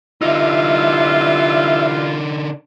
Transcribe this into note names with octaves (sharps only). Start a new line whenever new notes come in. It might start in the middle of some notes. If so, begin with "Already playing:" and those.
D3 E3 G3 D#4 F4 E5